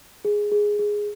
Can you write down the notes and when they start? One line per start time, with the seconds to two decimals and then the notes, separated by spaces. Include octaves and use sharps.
0.25 G#4
0.52 G#4
0.79 G#4